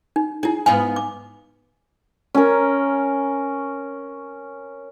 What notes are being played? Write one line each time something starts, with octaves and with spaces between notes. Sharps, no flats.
D#4
D#4 E4 G#4
G#2 B3 F5 G#5
D6
C#4 A#4